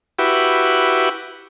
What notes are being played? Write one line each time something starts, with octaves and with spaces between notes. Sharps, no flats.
E4 F#4 G4 B4